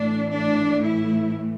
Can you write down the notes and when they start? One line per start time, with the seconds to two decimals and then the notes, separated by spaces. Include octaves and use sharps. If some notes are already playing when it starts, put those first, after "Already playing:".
Already playing: A2 E3 A3 D4
0.32 D4
0.85 E4